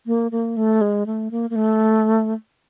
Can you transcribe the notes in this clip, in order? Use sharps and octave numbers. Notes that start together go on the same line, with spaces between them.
A#3
A#3
A3
G#3
A3
A#3
A#3
A3